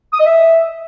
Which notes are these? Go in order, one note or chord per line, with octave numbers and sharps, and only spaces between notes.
D#6
D#5
E5